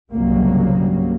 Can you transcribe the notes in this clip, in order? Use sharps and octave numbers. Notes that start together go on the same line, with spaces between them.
G1 C2 C#3 F#3 G3 A#3